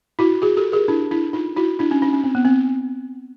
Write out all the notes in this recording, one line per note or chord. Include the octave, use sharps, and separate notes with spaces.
E4 F#4
F#4 G#4
G4 A4
G#4 A#4
D4 E4
D4 E4
D#4 F4
E4 F#4
D4 E4
C#4 D#4
C#4 D#4
C#4
C4
B3
C4